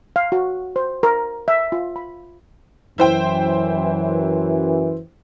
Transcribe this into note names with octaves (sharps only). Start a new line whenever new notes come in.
F5
F#4
C5
A#4
E5
F4
B5
F#2 E3 E4 C5 G5